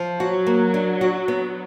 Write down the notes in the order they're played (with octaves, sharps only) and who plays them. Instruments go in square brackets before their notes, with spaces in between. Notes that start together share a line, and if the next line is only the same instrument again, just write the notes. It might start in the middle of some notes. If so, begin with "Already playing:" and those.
Already playing: [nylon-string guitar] F3
[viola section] F#3 [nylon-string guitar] F#4
[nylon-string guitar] A#3
D4
F#4
B3